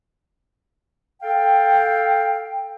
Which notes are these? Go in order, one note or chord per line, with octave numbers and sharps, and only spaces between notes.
A4 F5 G5